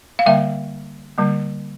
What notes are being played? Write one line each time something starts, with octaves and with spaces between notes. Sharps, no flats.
F5
D3 G3 A#3 E5 G5
D3 G3 A#3